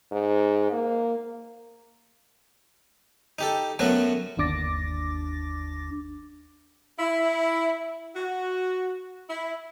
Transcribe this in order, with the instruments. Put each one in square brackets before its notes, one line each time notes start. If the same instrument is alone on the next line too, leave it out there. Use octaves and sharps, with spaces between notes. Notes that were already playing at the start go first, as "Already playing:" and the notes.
[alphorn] G#2
A#3
[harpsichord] D#4 G4 A4
F#2 F#3 A3 B3 F#4
[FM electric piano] G1 D#2 D4 D6 A6 A#6
[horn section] E4
F#4
E4